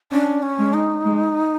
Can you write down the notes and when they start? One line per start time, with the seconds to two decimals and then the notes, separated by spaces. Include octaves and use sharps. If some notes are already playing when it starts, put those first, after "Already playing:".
0.12 C#4 D4
0.42 C#4
0.59 G#3
0.73 D#4
1.05 G#3